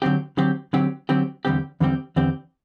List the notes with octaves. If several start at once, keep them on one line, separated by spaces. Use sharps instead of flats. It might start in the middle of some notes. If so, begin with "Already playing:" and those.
D3 F#3 C4 G4
D3 F#3 C4 G4
D3 F#3 C4 G4
D3 F#3 C4 G4
E2 D3 G3 C4 G4
E2 D3 G3 C4 G4
E2 D3 G3 C4 G4